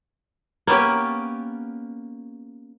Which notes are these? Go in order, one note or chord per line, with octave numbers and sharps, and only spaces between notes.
A#3 B3 C#4 G4